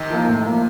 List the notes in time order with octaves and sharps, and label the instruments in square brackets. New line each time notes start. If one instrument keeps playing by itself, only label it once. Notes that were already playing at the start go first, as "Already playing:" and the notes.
Already playing: [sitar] C3 D#3
[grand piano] F3 A#3
A2
F3 A#3